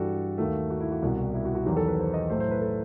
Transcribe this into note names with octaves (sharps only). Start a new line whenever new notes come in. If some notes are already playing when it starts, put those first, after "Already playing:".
Already playing: G2 E3 G3 F#4 A4
D#2 D#3 A3
F#4
E4
F#4
C2 B2 G3
E4
F#4
F#4
E2 D#3 F#3 G4
A4
B4
C5
D#5
A2 F#3 A3 C5
C5
B4
A4